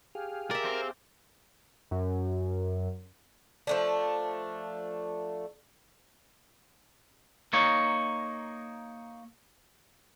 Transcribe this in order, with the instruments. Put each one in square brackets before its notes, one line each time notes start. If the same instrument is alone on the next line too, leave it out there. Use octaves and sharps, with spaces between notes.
[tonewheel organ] G4 G#4 F5
[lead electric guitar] A#4 [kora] D5 E5
[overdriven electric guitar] C4
[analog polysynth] F#2
[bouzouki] F3 A3 D4
[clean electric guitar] A#3 D#4 C#5